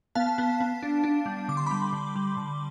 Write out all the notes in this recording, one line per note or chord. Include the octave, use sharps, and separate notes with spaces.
B3 F5 A5
B3
B3
D4
D4
G3
D3 D6
C6
G3 B5 D6
D3
G3
D3